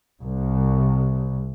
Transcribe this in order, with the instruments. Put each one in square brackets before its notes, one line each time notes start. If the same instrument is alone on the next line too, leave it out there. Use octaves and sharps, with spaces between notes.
[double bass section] C2